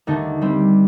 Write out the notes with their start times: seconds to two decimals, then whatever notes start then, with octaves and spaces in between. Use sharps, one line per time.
0.07 D#2 D3 A3 D#4
0.41 G3 C4 G4